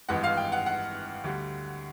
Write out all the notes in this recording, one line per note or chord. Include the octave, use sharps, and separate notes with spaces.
G#1 G2 E3 G#3 F#5
F5
G5
F#5
F#5
D2 D3 G3